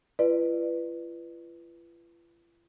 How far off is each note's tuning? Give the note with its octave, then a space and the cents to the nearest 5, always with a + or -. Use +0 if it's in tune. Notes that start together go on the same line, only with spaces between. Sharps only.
F4 -45 B4 +0 D5 +30